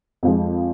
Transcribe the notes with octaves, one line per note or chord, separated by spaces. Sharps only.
F2 F3 G#3